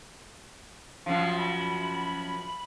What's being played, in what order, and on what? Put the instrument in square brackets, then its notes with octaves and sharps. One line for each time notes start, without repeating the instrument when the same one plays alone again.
[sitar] F#2 F3 [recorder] F5
[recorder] B5